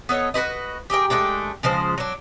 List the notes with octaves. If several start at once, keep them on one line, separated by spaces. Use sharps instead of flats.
B3 A4 C#5 D#5
F#4 G#4 B4 D#5
G4 G#4 A#4 G5
G#3 A3 D4 G5
C#3 F3 G#3 C5
F#3 D4